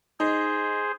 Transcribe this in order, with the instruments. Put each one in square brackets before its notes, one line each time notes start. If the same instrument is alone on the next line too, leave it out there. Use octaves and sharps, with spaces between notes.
[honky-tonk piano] D#4 [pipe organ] G#4 C5